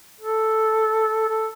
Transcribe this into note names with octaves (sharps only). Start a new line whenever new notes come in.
A4
A4